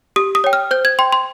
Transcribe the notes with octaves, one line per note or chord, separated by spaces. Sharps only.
G4 D#6
D#6
C#5 G5
F6
C5 G6
G#6
G5 C6
C6